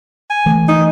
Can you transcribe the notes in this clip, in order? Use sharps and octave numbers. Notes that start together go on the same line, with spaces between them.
G#5
E3 A3
D#4